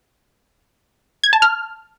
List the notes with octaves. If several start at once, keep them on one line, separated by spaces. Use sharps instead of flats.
G#6
A5
F6